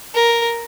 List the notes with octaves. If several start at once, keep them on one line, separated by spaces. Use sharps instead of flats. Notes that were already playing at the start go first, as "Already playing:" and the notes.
A#4